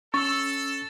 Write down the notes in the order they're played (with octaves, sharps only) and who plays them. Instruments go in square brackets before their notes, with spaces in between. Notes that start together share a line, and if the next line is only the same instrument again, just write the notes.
[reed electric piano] C#4 E6 [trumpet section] A4 [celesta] C#6 [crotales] A6